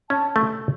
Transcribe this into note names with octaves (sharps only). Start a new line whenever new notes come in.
C#4 A5
A3